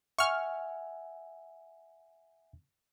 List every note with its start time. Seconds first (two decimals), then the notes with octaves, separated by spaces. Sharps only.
0.19 E5 F#5 G#5 C#6 F6